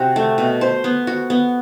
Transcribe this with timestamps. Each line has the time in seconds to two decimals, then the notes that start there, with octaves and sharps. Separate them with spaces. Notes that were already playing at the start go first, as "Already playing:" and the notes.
Already playing: C3 C4 F#4
0.16 A3
0.38 B2
0.61 C5
0.84 B3
1.07 F#4
1.30 B3